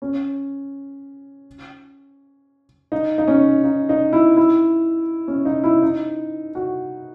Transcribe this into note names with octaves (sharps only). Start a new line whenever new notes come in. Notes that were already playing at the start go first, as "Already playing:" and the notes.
C#4
D#4
D#4
C#4
D#4
D#4
E4
E4
C#4
D#4
E4
D#4
F#4